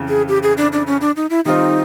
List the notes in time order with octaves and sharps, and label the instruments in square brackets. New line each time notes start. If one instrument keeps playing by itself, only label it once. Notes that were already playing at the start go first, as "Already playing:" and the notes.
Already playing: [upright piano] F2 C#3 E3
[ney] G#4
G4
G#4
D4
D4
C#4
D4
D#4
E4
[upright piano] D#3 G3 C4 F4 [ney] D#4